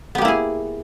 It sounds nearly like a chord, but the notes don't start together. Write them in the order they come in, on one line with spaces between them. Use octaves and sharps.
B3 G4 A#3 E4 G#4